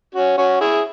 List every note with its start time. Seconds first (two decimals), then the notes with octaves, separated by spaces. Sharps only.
0.14 C#4 F#4
0.38 C#4 F#4
0.61 E4 G#4